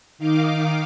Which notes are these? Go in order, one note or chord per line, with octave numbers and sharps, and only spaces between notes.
D#3 D#4 F5 D6